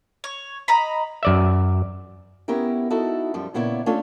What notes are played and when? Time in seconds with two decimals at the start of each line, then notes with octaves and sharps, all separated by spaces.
0.24 C#5
0.68 D#5 A#5 B5
1.23 F#2 D5 E5
2.48 B3 C#4 E4 G4 A#4
2.90 D#4 E4 F#4 A4
3.34 F#2 F3 G3
3.54 A#2 C#3 B3 E4 C#5 D5
3.86 A3 C#4 D4 F4 A4 C#5